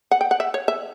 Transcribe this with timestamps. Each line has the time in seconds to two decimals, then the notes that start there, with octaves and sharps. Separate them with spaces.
0.11 F#5
0.21 G5
0.31 F#5
0.40 E5
0.54 C#5
0.68 E5